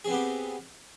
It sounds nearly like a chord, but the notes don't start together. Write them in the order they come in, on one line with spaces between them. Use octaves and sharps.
G#4 C4 B3 G4